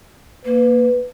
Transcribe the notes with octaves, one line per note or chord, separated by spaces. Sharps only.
A#3 B4